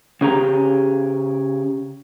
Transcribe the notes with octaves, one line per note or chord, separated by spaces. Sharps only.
C#3 C#4 G4 A#5